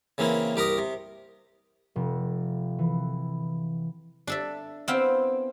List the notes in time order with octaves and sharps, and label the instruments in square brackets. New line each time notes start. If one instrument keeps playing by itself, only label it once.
[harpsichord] C#3 E3 A#3 C4 E4
C2 G4 A#4 A#5 D#6
C3
[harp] F1
E3
[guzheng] D4 A4 E5
B3 C4 E4 C5 F5 G5